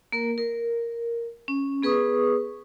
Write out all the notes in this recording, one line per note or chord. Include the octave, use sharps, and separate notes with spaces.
A#3 A#4
A#4
C#4
B3 G#4 B4 C#6 D#6